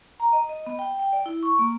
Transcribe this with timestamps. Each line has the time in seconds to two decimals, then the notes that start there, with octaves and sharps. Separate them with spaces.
0.20 A#5
0.33 D#5
0.49 D#5
0.66 B3
0.79 G5
0.99 G5
1.13 D5
1.26 E4
1.43 C#6
1.59 A#3